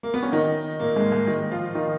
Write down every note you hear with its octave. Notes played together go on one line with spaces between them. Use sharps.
A#3
B3
C#4
D#3 D#4
A#2 A#3
G#2 G#3
G#2 G#3
D#3 D#4
F3 F4
D#3 D#4